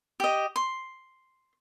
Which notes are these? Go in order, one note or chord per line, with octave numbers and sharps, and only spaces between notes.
G4 D#5
C6